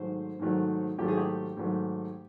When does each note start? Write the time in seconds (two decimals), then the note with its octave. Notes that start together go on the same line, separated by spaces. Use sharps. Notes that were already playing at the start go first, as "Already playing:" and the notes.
Already playing: G#2 D#3 F#3 A3 C5
0.40 G#2 D#3 F#3 A3
0.98 G#2 D#3 F#3 A3 G4
1.08 G#4
1.17 G4
1.57 G#2 D#3 F#3 A3